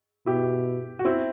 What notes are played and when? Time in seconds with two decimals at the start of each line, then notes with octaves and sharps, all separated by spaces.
0.26 B2 E4 G4
0.99 F#4
1.05 C4 E4